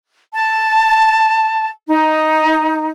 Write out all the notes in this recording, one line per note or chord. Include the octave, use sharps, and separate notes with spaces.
A5
D#4